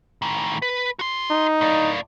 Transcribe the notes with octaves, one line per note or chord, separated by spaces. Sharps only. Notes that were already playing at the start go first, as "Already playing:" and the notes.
A2 D#3
B4
F#4 C6
D#4
A2 D5